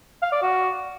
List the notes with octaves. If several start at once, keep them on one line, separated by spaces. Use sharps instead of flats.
F5
D5
F#4